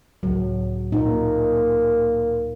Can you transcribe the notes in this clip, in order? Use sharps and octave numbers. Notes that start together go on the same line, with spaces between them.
C#2 A2 F#3
A#2 A#3 D#4